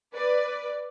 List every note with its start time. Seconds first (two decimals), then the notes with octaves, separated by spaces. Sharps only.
0.15 B4 D5